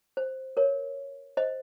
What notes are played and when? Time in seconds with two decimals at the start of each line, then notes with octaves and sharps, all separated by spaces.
0.17 C5
0.57 A#4 C#5
1.37 C5 D#5